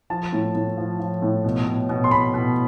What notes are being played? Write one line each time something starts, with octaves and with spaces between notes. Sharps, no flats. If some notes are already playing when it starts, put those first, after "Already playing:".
F3 A5
A2
A2
F3
F3
A2
B2
B2
B2
C6
B2 B5
B2